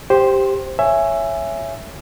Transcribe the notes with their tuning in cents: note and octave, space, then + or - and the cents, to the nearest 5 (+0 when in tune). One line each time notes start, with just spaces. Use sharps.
G4 +0 C5 +0 C6 +25
C#5 +0 E5 +15 G#5 +0